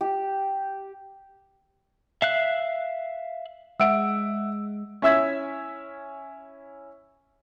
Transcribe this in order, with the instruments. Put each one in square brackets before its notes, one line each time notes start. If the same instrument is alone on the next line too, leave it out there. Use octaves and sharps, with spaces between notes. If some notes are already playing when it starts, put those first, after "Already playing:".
[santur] G4
[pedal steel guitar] E5 F5 F#6
[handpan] G#3 [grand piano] E5 F#5 D7 [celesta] E6
[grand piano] C#4 E4 E5 E6 G#6 B6